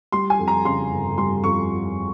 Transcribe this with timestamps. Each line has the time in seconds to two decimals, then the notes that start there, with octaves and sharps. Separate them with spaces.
0.12 G3 C6
0.30 G#5
0.39 F2
0.48 A#5
0.65 C#3 C6
0.91 G1
1.17 G3 C6
1.44 F2 C#6